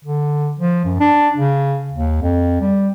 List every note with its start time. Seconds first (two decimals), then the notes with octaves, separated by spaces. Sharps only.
0.05 D3
0.60 F3
0.85 F#2
1.00 D4
1.37 C#3
1.92 D#2
2.22 F2
2.61 G3